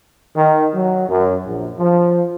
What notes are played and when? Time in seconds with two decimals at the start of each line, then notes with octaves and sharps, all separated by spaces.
0.36 D#3
0.74 F#3
1.09 F#2
1.46 A#1
1.78 F3